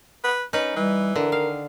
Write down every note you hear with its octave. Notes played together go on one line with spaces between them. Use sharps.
B4
C#4 D#4 B4
E3 G3
D3 A#4
D#3 F5